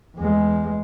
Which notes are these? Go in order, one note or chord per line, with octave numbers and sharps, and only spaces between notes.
E2 G#3